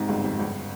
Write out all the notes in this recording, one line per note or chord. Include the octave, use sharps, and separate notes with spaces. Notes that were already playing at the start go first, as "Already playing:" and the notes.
Already playing: G#2 C3
G1 C#2 C#3
F2 C3
G1 C#2 C#3